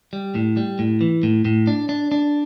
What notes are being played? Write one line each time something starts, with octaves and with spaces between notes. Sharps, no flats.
G3
A2
G3
A2
E3
A2
A2
D4
D4
D4